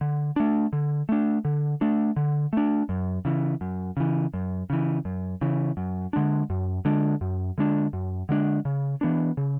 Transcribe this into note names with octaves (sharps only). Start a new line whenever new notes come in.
D3
A3 D4
D3
A3 D4
D3
A3 D4
D3
A3 D4
F#2
C#3 E3
F#2
C#3 E3
F#2
C#3 E3
F#2
C#3 E3
F#2
D3 G#3 D4
F#2
D3 G#3 D4
F#2
D3 G#3 D4
F#2
D3 G#3 D4
C#3
E3 B3 D4
C#3